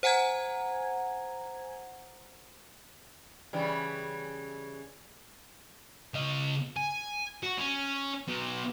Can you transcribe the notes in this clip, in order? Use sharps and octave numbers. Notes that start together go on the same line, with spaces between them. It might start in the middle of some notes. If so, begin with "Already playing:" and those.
C5 F#5 G#5 A#5 G#6
C#3 E3 G3
C#3 D#5
G#5
F#4
C#4
F#3 B3